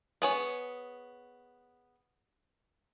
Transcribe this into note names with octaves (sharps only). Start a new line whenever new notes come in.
B3 G#4 C#5